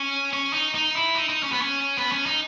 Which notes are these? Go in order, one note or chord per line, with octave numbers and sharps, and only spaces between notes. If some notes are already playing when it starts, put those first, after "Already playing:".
Already playing: C#4
C#4
D#4
D#4
E4
D#4
D#4
C#4
B3
C#4
B3
C#4
D#4